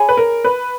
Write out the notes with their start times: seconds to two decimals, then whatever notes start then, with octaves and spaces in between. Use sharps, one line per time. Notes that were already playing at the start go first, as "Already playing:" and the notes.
Already playing: G#4 C#5 G#5 B5
0.09 B4
0.17 A#4
0.44 B4